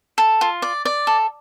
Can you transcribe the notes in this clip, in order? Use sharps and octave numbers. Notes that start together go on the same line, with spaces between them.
A4
F4
D5
D5
A4